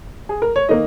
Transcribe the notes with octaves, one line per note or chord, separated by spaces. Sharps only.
G#4
A#4
C#5
D#3 A#3 D#5